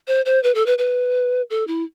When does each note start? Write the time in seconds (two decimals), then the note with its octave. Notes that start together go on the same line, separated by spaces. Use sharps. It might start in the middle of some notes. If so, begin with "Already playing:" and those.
0.07 C5
0.26 C5
0.44 B4
0.55 A4
0.66 B4
0.78 B4
1.50 A4
1.67 E4